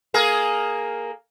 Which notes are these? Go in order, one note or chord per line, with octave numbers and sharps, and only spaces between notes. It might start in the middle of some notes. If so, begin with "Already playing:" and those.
A#3 G#4 A#4